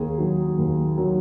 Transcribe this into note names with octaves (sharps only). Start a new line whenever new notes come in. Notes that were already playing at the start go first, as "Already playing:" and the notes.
Already playing: D#2 G#4
D#3 F#3
D#2
D#3 F#3